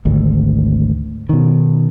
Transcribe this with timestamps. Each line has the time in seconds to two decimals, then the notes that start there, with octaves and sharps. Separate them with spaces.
0.05 G#1 D2
1.29 B2 D#3